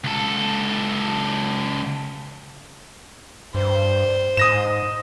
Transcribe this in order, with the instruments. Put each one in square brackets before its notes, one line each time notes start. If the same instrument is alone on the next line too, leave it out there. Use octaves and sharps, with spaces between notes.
[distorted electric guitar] C#2 A4
[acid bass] G2 [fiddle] C5
[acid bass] G#2 [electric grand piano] D#6 A#6 E7